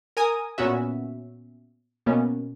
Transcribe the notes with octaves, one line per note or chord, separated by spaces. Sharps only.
A#4 G#5 D#6
A#2 B3 C#4 F#4 E5
B2 A#3 B3 C#4